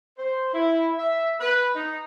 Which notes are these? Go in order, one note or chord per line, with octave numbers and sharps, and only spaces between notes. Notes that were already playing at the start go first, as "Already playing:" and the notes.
C5
E4
E5
B4
D#4